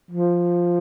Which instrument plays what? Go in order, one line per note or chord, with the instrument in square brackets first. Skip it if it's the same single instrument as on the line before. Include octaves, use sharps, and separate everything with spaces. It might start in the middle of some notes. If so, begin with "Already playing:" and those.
[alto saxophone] F3